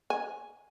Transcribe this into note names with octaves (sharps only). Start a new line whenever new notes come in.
G#5